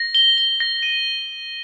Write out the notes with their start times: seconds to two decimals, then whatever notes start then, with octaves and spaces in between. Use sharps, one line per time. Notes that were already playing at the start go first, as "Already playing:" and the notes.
Already playing: A#6
0.15 G7
0.38 G7
0.60 A#6
0.83 D#7